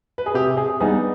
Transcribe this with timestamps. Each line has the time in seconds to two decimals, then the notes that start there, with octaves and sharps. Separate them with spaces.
0.18 B4
0.26 G#4
0.34 C3 G4
0.57 G#4
0.80 G3 B3 D#4 G#4